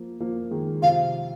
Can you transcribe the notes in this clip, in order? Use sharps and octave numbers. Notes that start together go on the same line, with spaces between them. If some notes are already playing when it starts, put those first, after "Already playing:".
Already playing: F3 A#3
F3 A#3
D#3 G#3
C3 F3 F5